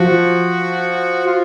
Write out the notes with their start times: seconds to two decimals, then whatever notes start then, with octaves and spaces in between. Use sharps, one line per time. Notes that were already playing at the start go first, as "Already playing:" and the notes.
Already playing: F3 F#4
1.27 F4